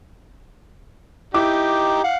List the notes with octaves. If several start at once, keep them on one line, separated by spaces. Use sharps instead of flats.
D#4 E4 G4 D6
F5 F#5